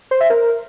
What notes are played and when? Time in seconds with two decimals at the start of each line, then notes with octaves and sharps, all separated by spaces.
0.11 C5
0.20 E5
0.30 A#4